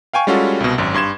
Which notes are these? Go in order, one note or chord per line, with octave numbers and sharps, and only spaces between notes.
F5 G5 G#5 C#6
G3 G#3 C#4 F4 F#4 A4
C2 B2
G#1 F#2
G2 C6 G#6 E7